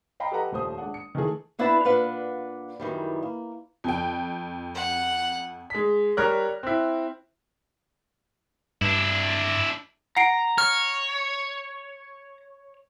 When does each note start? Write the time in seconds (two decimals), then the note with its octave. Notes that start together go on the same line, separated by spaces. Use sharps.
0.20 D#5 F5 G5 A#5 B5
0.32 G4 A4 B4 D#5 F#5 A#5
0.52 D#1 G3 A3 C5 D#6
0.78 G#3 D4 F#5
0.94 C#7
1.15 D#3 E3 A3 G#4
1.59 B3 D4 E4 B4 F#5 A5
1.85 A#2 D4 B4 F5 F#5
2.80 F#2 D#3 E3 G3
3.23 A#3
3.84 F2 G5
4.75 F#5
5.70 G#3 B6
6.17 G3 A#4 C#5 F6 F#6
6.63 C4 E4
8.81 G2 D4 E4
10.17 F#5 A#5 C7 D7
10.58 C#5 F6